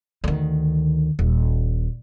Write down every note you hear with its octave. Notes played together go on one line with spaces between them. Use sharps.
D2 D#3
D#1